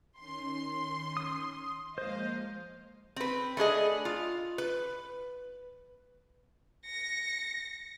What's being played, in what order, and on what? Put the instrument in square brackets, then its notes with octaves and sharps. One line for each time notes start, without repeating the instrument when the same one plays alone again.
[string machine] D#3 C#4 C7 [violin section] C6
[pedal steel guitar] D#6
[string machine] F3 G#3 A#3 [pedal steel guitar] C5 [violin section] D#5 F5
[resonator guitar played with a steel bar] C4 B4
A3 D4 G#4 D#5
F4
B4
[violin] A#6 C#7